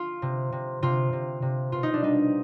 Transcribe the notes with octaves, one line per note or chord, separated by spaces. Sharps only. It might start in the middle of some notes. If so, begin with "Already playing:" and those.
Already playing: F4
C3
C3
C3 F4
C3
C3
B2 F4
D#4
D4
G3 D#4